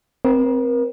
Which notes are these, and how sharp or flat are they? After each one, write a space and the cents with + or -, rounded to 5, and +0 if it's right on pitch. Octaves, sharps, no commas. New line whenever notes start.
C4 +0 A#4 +40